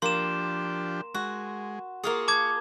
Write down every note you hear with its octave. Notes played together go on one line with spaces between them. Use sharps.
F3 A#3 D4 G4 C6 E7
G#3 F#4
A#3 F4 G#4 C#6
A5 D6 G#6